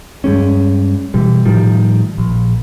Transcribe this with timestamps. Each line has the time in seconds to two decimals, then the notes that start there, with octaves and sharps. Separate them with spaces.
0.24 G2 G3 G#3 C#4
1.14 B2 E3 G3
1.45 A2 D#3 F3 G3
2.18 A#1